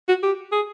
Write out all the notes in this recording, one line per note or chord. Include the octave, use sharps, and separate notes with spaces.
F#4
G4
G#4